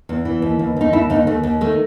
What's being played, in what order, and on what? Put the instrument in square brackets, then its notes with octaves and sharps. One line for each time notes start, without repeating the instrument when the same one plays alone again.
[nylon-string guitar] E2
E3
D#2
D#2
D#2 D#4
D#2 E4
D#2 D#4
D#2 A3
D#2
D#3 A3